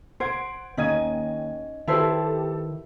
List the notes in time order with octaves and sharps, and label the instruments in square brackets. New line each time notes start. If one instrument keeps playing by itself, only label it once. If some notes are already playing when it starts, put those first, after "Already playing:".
[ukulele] C5 [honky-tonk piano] F#5 G#6 D7
[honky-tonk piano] D#2 G#6 D#7 [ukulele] C#4 D#4 D#5
[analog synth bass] D#3 [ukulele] E4 B4 C5 [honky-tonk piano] G4 A4 A5